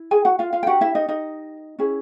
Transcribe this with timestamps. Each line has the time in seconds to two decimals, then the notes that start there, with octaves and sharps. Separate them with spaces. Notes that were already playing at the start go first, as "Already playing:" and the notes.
Already playing: E4
0.11 G#4 G#5
0.25 F#4 F#5
0.39 F4 F5
0.53 F4 F5
0.63 G5
0.66 D4 F#4 G4 A#4 F#5
0.81 E4 E5
0.95 D#4 D#5
1.09 D#4 D#5
1.79 C#4 E4 G#4